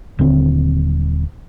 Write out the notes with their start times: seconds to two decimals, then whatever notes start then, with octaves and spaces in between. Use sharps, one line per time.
0.19 D#1 D3 C4